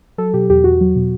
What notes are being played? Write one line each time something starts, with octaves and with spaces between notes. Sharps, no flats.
F#3 A4
B2 G4
E2 G4
E2 F#4
F#3
B2